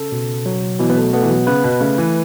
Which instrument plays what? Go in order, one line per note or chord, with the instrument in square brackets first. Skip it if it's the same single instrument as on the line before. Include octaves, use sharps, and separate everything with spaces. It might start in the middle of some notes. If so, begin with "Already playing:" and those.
Already playing: [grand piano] C#3 [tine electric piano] A4
[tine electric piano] B2
F#3
[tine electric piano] B2 [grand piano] E3
[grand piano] B3
A3
[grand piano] A3 [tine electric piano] B3
[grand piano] E3
F#3
[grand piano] C#3 [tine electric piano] B4
[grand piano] B2
[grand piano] C#3 [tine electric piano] A3
[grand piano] E3